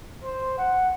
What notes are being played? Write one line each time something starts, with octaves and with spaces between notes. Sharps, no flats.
C5
F#5